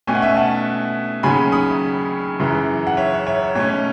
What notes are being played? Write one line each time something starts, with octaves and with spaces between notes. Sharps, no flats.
B2 A3 C#4 G#5
F#5
E5 G#5
F#5 A5
D#2 C#3 F#3 C#4 G#5 B5
B5 D#6
F#2 C#3 E3
F#5
C#5 E5
C#5 E5
B2 A3 C#4 C#5